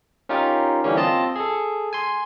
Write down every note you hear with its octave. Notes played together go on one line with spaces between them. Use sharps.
C#4 D#4 F4 G4 A#4
D3 E3 G3 A#3 C#4
C4 F4 D#5 A5
G#4 A4
G#5 C6